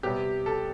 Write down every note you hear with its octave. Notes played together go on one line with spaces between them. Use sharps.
C3 G3 B3 G4
A4